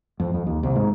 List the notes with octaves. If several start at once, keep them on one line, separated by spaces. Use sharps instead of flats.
F2
F2
D#2
C2
G#2